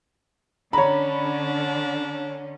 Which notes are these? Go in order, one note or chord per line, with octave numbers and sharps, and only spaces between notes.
D3 C#4 D4 C#5 A#5 B5